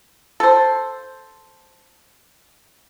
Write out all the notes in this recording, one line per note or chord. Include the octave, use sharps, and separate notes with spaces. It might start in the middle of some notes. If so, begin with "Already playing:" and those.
A4 C5